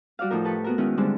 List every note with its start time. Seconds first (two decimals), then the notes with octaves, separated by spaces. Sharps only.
0.19 G3 F#4 D5 F5
0.31 A2 F3 D#4 A#4
0.45 G4 A4 B4 C#6
0.64 B3 F#4 A#4
0.78 D#3 G#3 B3 C#4 E4
0.97 D3 G3 G#3 C4